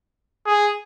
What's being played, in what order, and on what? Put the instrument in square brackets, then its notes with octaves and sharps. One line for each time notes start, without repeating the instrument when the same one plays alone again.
[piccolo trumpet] G#4